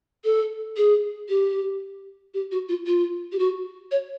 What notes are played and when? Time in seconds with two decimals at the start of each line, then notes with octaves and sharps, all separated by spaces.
0.25 A4
0.77 G#4
1.29 G4
2.34 G4
2.52 F#4
2.69 F4
2.87 F4
3.32 G4
3.39 F#4
3.91 C#5